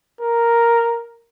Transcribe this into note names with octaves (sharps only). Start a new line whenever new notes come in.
A#4